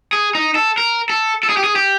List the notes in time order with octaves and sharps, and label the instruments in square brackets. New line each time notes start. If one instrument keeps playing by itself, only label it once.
[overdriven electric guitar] G#4
D#4
A4
A#4
A4
A4
G#4
G4
G#4
G4